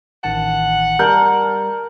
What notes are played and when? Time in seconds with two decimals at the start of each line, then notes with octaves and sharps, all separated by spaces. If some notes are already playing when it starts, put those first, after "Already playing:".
0.24 A1 D#3 F#5 A5
0.99 G3 A#4 A5 G6